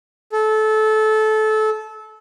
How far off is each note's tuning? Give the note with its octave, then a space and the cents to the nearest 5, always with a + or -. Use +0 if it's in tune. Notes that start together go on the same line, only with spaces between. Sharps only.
A4 -20